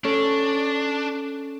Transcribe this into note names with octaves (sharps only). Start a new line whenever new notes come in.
C#4 D4 A4